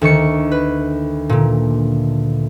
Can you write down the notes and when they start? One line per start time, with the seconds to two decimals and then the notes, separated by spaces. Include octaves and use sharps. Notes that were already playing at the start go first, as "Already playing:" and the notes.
0.01 D2 D#3 C#6 C#7
0.51 B4
1.29 A#2 D3